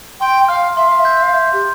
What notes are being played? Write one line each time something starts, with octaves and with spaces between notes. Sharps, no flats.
G5 C6
F5 F6
E5 C6
F5
E5
G6
F5
E5 G6
G4